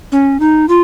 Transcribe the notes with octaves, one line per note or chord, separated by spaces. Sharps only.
C#4
D#4
F4